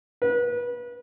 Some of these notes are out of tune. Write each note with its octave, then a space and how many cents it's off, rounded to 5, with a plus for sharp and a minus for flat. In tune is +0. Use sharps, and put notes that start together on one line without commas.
B4 -30